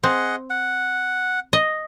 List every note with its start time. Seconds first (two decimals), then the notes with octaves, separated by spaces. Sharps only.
0.04 C4 G#4 D#5 F#5
0.50 F#5
1.53 D#5